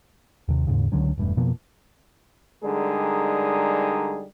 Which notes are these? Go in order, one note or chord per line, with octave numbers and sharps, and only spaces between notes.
D#2 C3
D#2 G#2 C#3
C#2 D3 F#3 C#4
E1 G2 A3
F2 B2 F3 A#3
D3 G3 G#3 D#4 G#4 A#4